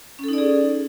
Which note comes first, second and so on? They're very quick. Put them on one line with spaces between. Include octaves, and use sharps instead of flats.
C#4 A4 D#4 D5 G#4